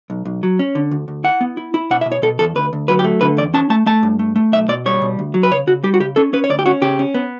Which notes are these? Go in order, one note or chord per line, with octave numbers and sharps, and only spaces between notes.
B1
B1
F#3
C#4
D3
D2
D2
E4 F#5
B3
E4
E4
B2 F#5
E5
B2
C#5
B2 A4
E2 A4
D2 B4
D2
F#3 B4
G4
A3
D3 B4
E2 D5
C#4 A5
A3 A5
A3 A5
G2
A3
A3
B1 E5
B2 D5
G3 C#5
B2
D2
F#3
B4
C#3 C#5
C#3 F#4
G3 G4
F#4
C#3 G4
C#4 A4
C#4 B4
C#5
D2 D5
G4
C#4 F#4
C#3 G4
C#4
B3